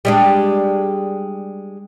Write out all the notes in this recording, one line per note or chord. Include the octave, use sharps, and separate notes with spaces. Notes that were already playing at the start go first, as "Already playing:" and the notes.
G3 G#3 D4